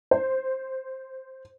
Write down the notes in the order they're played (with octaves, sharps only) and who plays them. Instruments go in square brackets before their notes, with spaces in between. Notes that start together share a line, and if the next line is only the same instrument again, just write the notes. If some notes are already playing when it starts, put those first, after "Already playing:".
[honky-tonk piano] C5